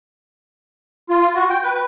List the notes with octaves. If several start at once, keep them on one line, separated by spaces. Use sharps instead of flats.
F4
F#4
G5
B4